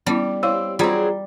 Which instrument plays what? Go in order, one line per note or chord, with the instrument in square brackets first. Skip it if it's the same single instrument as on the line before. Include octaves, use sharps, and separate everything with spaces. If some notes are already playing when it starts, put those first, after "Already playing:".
[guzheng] G3 [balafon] B3 C#4 E4
[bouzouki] C4 [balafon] E4 F5 C6 [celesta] C#5 E6
[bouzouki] F#3 C4 G#4 [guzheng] G3 [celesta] F4 D5 A#5